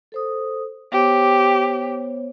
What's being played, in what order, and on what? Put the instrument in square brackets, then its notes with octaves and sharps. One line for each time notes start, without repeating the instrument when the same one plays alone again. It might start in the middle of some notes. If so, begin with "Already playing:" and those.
[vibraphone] A4 C5 D#6
[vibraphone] B3 C5 C#5 [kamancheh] G4